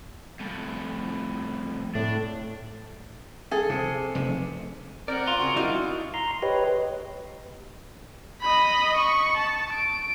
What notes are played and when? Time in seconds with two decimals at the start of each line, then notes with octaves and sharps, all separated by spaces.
0.40 F2 A2
1.95 A2 D4
3.51 G#4 A4
3.69 C3
4.15 F1 C3
5.08 C4 A#4 D5 F#5
5.28 F4
5.39 C#3 F#4
5.56 D3 G3 D#4 E4 F#4
6.14 A#5 C6
6.42 G4 B4 C#5 D#5
8.42 D#5 B5
8.97 C#6
9.37 A5
9.73 D7